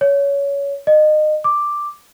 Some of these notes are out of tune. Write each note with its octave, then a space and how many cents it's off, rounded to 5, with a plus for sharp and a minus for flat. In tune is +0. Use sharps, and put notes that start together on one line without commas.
C#5 +20
D#5 -25
D6 +5